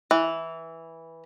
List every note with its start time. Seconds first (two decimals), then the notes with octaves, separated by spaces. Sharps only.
0.11 E3